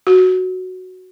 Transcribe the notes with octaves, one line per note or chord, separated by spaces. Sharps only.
F#4